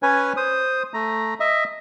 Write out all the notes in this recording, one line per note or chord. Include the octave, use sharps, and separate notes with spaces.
C#4 B4 C#5 G#5
C5 D#6
A3 A#5
D#5 E5